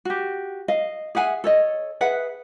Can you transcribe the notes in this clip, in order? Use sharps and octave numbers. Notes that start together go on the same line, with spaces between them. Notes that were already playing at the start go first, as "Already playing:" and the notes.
F#4 G4
D#5 F5
G#4 E5 F#5 G#5
A4 C#5 D#5
G#4 B4 E5 F#5